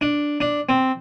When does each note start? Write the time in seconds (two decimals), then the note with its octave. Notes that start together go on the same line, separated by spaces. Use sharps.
0.01 D4
0.41 D4
0.69 C4